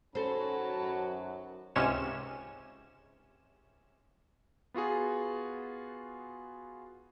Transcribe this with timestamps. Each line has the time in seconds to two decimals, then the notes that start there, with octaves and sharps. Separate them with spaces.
0.15 D#3 F#3 C#4 F#4 A4 C5 A5 B5
0.75 F#2
1.75 C#2 G#2 C3 C#4 E7
4.74 B3 F4 F#4 G#4